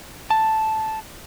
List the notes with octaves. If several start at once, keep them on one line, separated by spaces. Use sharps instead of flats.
A5